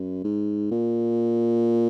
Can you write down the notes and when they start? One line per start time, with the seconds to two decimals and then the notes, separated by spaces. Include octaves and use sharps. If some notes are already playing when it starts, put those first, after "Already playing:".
Already playing: F#2
0.24 G#2
0.71 A#2